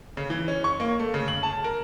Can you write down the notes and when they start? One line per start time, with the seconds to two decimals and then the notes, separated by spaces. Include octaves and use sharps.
0.17 C#3
0.30 E3
0.48 C#4
0.64 C#6
0.80 A#3
0.99 A3
1.14 C#3
1.28 F#7
1.43 A5
1.64 A#4